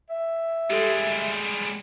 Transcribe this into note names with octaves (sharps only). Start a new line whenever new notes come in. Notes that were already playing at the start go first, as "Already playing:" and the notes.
E5
G3 G#3 G4 A4